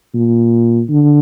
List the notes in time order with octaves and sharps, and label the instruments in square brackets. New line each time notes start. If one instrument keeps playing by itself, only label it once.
[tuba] A#2
D3